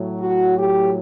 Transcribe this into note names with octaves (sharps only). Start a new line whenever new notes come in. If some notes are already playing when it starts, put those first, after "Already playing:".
Already playing: A2 F#3
F#4
G4